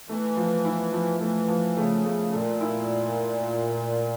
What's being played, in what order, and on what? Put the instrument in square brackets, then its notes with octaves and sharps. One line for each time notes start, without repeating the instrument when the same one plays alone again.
[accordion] E3 [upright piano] A3
[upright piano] F3
E4
F3
[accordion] E3 [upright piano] A3
[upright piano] F3
[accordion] C#3 [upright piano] A3
[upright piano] A3
[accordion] A#2 [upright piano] A4
[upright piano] E4